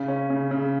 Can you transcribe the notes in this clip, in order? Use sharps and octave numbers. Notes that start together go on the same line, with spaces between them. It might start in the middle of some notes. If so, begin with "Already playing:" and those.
Already playing: C#3
C#4
C#3
C#3